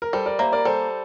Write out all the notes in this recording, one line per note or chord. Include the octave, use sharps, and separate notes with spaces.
A#4
G3 A4 C5
A#4 D5
A#3 C5 E5
A#4 D5
G3 A4 C5